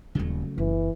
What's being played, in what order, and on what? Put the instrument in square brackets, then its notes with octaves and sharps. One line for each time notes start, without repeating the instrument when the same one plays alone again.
[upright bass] D#1 G3 [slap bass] C#3 F#3 A3
[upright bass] F#1 [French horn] E3